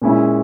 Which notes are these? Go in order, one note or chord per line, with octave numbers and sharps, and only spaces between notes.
A#2 G#3 C#4 E4